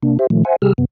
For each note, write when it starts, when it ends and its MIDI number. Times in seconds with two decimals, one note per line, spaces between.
0.03 0.18 48
0.03 0.18 58
0.03 0.18 62
0.19 0.27 67
0.19 0.27 72
0.19 0.27 76
0.30 0.44 46
0.30 0.44 51
0.30 0.44 53
0.30 0.44 57
0.45 0.56 72
0.45 0.56 76
0.45 0.56 78
0.45 0.56 80
0.62 0.73 48
0.62 0.73 55
0.62 0.73 67
0.62 0.73 68
0.62 0.73 88
0.62 0.73 89
0.78 0.85 42
0.78 0.85 48
0.78 0.85 59